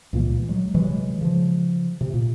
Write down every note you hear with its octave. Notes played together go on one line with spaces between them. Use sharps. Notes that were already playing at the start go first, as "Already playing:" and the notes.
C#2 A#2 E3 A#3
F#3 G#3
C3 E3 F#3 G#3
C#3 F3
C3
A#2